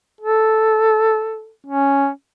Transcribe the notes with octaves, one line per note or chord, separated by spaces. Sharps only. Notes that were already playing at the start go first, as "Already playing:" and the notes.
A4
C#4